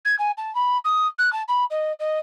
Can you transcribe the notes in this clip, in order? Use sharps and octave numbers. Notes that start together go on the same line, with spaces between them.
G#6
G#5
A5
B5
D#6
F#6
A5
B5
D#5
D#5